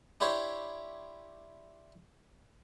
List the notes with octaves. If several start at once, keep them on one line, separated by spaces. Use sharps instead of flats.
D4 E4 G4 C5 C#5